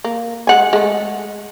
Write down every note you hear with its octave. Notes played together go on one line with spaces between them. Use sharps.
A#3
G#3 F#5 G#5
G#3 A3